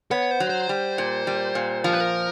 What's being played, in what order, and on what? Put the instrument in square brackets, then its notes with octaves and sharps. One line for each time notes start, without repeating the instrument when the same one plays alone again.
[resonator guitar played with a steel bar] B3 [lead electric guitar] C#5
[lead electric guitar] C5
[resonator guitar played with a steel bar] F#3
[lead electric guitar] C5
[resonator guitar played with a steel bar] G3
A#2
G3
A#2
[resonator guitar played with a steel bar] F3 [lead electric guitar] A#4
[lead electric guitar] B4
A#4